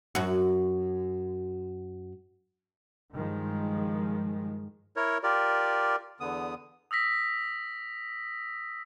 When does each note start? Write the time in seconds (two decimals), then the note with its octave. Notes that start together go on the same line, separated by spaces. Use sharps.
0.15 F#2 F#4
3.15 G2 D#3 F3 G#3
4.96 E4 A#4 C#5
5.23 F4 G4 A#4 D5
6.20 E2 D3 B3 D#6
6.91 D#6 E6 A#6 B6